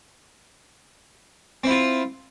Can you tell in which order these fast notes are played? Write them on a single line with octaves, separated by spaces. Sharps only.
C4 E4 F4